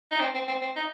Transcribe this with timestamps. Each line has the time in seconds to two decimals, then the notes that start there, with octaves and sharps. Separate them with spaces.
0.11 D#4
0.20 C4
0.34 C4
0.48 C4
0.62 C4
0.76 D#4